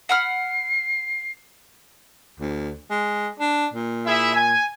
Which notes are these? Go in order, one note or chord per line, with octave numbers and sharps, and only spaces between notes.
F#5 B5 F6 C7
D2
G#3
D4
A#2
E4 G#4 E5
G#5